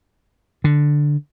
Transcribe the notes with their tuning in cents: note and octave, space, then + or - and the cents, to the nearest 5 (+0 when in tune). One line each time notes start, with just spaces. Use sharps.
D3 +0